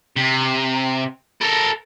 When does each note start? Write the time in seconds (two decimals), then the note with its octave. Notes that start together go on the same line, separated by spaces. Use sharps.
0.16 C3
1.41 A4 A#4